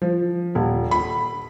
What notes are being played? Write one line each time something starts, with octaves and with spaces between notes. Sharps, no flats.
F3
D#1
B5